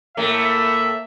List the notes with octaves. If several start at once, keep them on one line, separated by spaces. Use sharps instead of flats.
A2 A3 A#3 E5